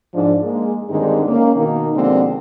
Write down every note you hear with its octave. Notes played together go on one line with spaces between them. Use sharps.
G#2 F3 D4
G#3 A#3
G2 D3 D#3 G#3 C4 D#4
A#3 C#4
B2 D#3 A#3 D#4
B2 D3 F3 G#3 A#3 C4